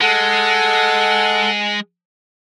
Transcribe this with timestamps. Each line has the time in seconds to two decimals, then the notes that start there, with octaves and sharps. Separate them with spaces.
0.01 G#3 A4 F#5